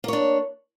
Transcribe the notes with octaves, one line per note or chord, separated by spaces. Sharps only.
A#3 D4 C#5